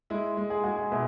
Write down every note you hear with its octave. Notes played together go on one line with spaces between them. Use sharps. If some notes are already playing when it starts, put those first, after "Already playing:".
G#3 E4
G#3
G#4
G#3 F#4
G#4
B2 E5